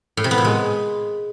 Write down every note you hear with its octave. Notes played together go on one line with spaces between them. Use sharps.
A2
C3
B3
A#2
G#3